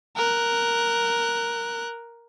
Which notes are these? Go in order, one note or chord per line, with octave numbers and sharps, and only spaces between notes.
A#4 F#6